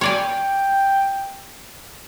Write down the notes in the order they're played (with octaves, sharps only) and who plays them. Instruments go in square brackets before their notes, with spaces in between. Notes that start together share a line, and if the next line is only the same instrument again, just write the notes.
[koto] C#5 D5 G#5 [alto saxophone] G5